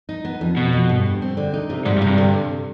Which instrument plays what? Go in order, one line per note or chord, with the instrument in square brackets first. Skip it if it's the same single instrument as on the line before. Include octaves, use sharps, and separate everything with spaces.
[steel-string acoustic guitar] D#4
B3
F2
[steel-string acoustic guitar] F2 [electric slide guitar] B2
[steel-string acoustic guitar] F2
G2
C4
C4
D3
D#4
C3
[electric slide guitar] G#2 [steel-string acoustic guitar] G3
[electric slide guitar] G2
[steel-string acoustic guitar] C3
[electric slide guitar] G2
[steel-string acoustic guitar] D3